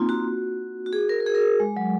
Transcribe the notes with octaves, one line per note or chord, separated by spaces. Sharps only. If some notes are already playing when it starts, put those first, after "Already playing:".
Already playing: A#3 C4 D#4 F4
F#4
F#4
G#4
A#4
A#4
G#4
A#4
G#3
F#3